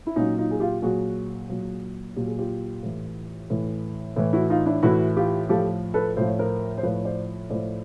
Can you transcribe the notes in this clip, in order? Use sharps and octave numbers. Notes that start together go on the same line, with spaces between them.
E4
A#2 F#3 C#4 D#4
D#4 F4
G#4
F4 G4
A#2 F#3 F#4 G#4
A#2 F#3
A#2 F#3 G4
G#4
F4 G4
A2 E3
A2 E3
A2 E3
E4 F#4
D#4 F4
D4 E4
A2 E3 E4 F#4
F4 G4
A2 F3 G4 A4
A4 B4
A2 F3 C5
C#5
A#4 C5
C5
A2 F3 B4 C#5
C5 D5
A2 F3 C5 D5